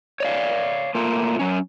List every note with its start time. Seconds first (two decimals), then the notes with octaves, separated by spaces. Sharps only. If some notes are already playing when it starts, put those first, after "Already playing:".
0.20 C#5 D5 F5
0.95 A3 A#3 F4
1.39 F#3 C#4